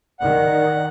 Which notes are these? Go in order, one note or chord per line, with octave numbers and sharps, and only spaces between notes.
D#3 D5 F#5